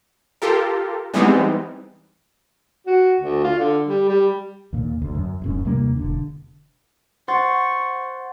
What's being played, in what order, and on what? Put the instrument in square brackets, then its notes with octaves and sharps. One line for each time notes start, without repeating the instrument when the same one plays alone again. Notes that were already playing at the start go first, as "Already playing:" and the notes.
[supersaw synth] F4 G4 A4 A#4
E3 G3 G#3 B3 C4 D#4
[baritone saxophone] F#4
D2
F4
D3
G3
G3
[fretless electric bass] D#2 A#2
D2
F#2
D#1 F#2 C#4
D#2 C3 G3 A#3
E1 D3
[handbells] C5 C6 A6 [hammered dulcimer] F#5 [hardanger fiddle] C#6